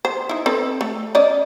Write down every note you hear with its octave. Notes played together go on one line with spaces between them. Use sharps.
C5
D#4 E4
C4 A4 B4
A3
C#4 D5 D#5